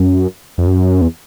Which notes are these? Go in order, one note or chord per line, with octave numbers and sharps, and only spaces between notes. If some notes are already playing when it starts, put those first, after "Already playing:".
Already playing: F#2
F2
F#2
E2